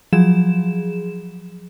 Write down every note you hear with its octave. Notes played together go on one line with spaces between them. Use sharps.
F3 F#3 G#4 E7